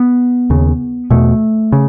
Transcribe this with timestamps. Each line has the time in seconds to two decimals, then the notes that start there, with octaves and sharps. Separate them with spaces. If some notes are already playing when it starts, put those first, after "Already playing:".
Already playing: B3
0.50 D#2 C#3
1.10 E2 B2 A3
1.72 C#3